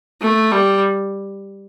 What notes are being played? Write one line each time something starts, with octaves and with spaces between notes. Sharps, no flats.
A3
G3